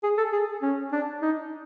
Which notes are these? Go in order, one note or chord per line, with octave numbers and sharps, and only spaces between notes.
G#4
A4
G#4
C#4
D4
D#4